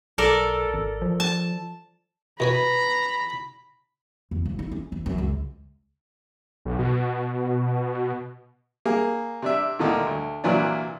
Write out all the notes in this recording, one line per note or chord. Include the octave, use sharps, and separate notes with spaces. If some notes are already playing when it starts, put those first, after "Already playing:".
B1 A4 A#4 D5
G#1
F3
A5
B2 B4 C#5 G#5 A#5 B5
E2
E1
D#4
C#4
E3
F#2
C#2
B1
B2
A#3 G#4
C3 D4 E5
D2 A#2 D3 D#3
D2
C2 A#2 E3 F#3 D4